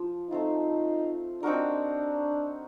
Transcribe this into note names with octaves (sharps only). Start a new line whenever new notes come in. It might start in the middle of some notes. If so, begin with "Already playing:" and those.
Already playing: F3
A3 C4 D#4 F4
C4 D4 D#4 F#4 A#4